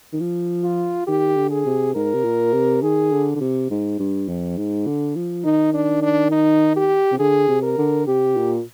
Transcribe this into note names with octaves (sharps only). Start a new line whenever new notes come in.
D#3
F3
F4
D#3 G4
D3
G#4
C3
G#2 A#4
C3
A#2
C3
D#3 G#4
D3
D3
C3
G#2
G2
F2
G#2
D3
F3
D#3 D#4
D4
D4
D#4
G4
C3
D3 G#4
C3
A#4
D3
C3 G4
A#2